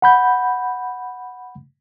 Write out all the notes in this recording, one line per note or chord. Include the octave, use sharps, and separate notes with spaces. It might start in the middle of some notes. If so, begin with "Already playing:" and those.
F#5 B5 G6